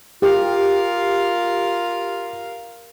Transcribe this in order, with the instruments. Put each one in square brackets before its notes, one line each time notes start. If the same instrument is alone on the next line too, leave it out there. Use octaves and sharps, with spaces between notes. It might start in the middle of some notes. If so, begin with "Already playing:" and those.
[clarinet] F4 [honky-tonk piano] G4 [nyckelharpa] A#4 F5